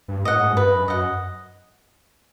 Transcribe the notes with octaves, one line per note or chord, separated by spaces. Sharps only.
G2
A2 D#5 F#5
G#2
F#2
G2 B4
F#2
F#2 D#5 F#5